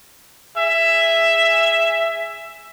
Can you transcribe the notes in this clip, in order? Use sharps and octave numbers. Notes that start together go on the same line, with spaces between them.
G#4 E5